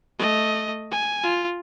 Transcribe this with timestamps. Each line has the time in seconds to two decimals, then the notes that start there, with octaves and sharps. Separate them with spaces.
0.19 A3 D#5
0.91 G#5
1.24 F4